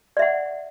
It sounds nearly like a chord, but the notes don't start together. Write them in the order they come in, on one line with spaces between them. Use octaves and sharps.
D5 E5 F#5